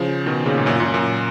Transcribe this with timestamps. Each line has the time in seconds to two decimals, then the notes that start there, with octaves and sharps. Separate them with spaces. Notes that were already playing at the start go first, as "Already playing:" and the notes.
Already playing: C#3 F3
0.26 B2 D#3
0.46 A#2 C#3
0.58 G#2
0.66 F#2 A#2
0.80 F#2 A#2
0.94 F#2 A#2